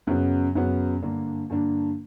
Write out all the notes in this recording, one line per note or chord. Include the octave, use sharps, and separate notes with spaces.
F#2 C#3 F#3 B3
F#2 C#3 F#3 B3
G2 D3 A#3 D4
G2 D3 A#3 D4